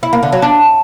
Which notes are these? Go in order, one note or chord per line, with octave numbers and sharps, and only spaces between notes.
E4
A#3
D3
F#3
D4